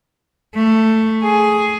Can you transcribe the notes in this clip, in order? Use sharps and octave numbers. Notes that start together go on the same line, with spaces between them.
A3
G#4